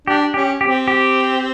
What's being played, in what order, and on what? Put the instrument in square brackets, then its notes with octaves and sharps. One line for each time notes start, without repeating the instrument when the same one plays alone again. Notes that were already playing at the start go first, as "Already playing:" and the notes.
[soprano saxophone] D4 [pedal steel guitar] G4
[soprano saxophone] C#4 [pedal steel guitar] G4
[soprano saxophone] C4 [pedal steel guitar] G4
[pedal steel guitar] G4